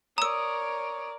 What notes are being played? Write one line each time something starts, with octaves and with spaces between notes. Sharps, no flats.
A#4 C#5 D5 A#5 D#6 E6